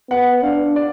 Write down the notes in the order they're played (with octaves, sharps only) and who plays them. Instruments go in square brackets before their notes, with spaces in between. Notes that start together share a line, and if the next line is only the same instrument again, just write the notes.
[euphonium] B3 [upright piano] F#5
[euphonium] D4 [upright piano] F5
[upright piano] D5